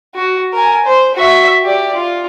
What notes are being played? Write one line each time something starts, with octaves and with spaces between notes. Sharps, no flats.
F#4
A#4 G#5
C5
F#4 E5
G4 D5
F4